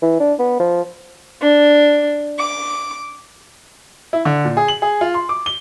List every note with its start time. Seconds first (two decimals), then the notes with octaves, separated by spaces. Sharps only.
0.02 E3
0.20 D4
0.39 B3
0.60 F3
1.42 D4
2.39 D6
4.13 E4
4.25 D3
4.45 A#2
4.57 G#4
4.68 F#7
4.82 G#4
5.01 F4
5.14 C6
5.29 D6
5.46 G7